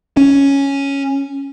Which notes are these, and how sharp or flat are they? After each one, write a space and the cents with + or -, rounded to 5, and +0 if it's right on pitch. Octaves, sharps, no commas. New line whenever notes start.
C#4 +0